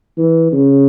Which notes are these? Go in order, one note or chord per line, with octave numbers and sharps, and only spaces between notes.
E3
C#3